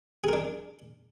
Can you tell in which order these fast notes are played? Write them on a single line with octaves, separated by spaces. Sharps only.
G#4 A#4 D4